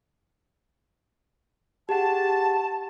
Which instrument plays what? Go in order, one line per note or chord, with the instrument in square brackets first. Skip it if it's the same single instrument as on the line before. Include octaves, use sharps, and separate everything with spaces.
[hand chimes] G4 G#4 F#5 [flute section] A5